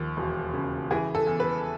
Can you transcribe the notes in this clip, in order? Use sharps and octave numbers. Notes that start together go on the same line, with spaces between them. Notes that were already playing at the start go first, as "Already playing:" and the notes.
Already playing: D#2 F3
E1
C#3
E3 G#4
A4
E2
B4